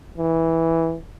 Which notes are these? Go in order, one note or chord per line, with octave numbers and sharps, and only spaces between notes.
E3